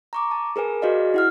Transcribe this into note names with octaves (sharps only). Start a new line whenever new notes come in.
A#5 C#6 D6
A5
G#4 A#4 B4 G#5
F#4 G#4 B4 D5 D#5 F5
E4 F#5 F6